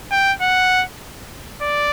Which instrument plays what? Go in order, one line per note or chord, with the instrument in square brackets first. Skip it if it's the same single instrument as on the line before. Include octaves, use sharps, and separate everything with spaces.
[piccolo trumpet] G5
F#5
D5